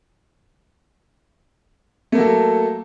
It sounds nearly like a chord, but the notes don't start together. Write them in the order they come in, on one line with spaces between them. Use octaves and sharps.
A3 A#3 F#3 A4